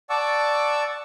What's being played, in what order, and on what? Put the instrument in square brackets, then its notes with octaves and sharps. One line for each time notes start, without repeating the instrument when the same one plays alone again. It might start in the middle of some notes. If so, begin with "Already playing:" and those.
[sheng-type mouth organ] D5 F#5 A5 C#6 D6 E6